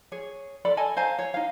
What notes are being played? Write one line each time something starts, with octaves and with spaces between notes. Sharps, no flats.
G#4 C#5
A4 D5 B5
A4 D#5 G#5 A5
C5 F5 G#5 A#5
C#5
D#4 F5